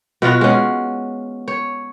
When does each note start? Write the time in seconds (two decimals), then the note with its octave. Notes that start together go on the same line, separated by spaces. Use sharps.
0.22 B2 B3 F4 F#4
0.41 G#3 C#4
1.48 C#5